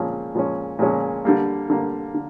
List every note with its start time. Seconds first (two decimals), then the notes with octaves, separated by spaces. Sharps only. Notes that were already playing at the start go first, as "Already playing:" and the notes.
Already playing: A#2 F3 G#3 C#4
0.35 A#2 F3 G#3 C#4
0.79 A#2 F3 G#3 C#4
1.25 D3 G3 A#3
1.70 D3 G3 A#3
2.14 D3